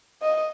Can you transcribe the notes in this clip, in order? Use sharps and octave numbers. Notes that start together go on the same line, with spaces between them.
D#5